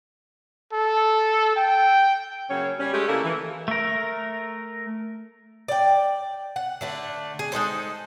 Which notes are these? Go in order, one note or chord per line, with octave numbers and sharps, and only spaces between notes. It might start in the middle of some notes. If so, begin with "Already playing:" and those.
A4
G5
C#3 F#3 A#3 C#4 C#5
G3 C#4
G#3 A3 G4
C#3 A#3 E4 A4
E3
A3 A#4
D5 G5
F#5
D3 A3 D4
G#4
G#3 D#4 A4 C5